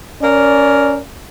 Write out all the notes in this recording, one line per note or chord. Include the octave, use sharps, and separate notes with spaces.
C#4 A#4 D5